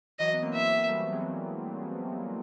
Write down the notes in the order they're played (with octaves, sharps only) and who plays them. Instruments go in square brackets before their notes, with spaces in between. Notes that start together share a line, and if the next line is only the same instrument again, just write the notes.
[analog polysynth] E3 F#3 [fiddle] D#5
[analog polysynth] B3
A#3 C4
[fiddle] E5
[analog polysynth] G3 A3
F#3 G#3